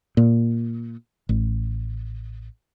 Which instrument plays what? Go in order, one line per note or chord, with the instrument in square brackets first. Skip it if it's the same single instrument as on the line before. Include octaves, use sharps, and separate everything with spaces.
[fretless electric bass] A#2
A1